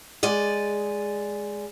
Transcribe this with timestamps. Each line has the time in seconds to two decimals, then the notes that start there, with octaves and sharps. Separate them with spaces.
0.23 G#3 D5 D#5